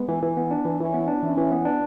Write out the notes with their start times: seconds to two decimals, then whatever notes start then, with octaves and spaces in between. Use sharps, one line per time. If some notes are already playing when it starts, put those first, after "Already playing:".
Already playing: G#3 B3
0.08 E3
0.22 E3
0.37 B3
0.51 D4
0.65 E3
0.79 E3 C#4 E4
0.94 B3
1.08 D4
1.22 E3 C#4 E4
1.37 E3
1.51 B3
1.65 D4